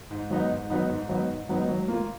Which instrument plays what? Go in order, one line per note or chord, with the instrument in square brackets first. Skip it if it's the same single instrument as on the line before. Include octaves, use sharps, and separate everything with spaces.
[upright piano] G#2
F#3 B3 D#4
G#2
F#3 B3 D#4
G#2
F#3 B3 D#4
G#2
F#3 B3 D#4
F#3
A#3 F4